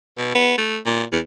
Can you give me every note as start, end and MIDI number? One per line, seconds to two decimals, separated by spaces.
0.18 0.33 47
0.35 0.55 59
0.58 0.78 57
0.86 1.03 46
1.12 1.20 40